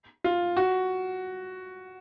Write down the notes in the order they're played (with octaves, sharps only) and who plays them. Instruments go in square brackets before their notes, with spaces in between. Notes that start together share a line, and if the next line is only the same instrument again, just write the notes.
[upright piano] F4
F#4